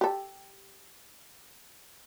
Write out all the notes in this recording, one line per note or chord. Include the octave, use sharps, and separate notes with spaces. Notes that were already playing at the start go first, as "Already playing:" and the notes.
G4 A4